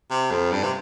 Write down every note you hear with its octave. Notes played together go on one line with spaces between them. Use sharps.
C3
F2
G2
C3